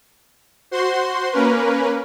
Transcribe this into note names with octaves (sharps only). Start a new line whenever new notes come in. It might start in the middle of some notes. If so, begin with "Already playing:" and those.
F#4 C5 C6
A#3 C#4 A#4 B4